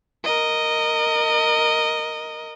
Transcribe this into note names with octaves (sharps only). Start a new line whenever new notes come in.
A#4 D#5